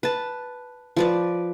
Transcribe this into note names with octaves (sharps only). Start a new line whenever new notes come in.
B4 A5
F3 B4 D5